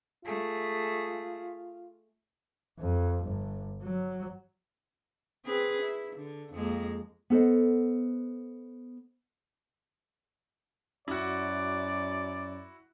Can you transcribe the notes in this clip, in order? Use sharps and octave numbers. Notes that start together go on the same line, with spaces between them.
A3 F4 G#4
F2
G1
F#3
C4 G#4 B4
E4
D3
F2 G#3 A#3
B3 A4 C5 D#5
F#2 E4 F#4 D5